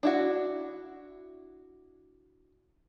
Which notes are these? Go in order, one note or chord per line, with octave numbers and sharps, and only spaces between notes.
D4 E4 F#4